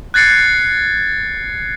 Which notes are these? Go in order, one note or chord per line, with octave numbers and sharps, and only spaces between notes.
F#6 G#6 A6 C7 C#7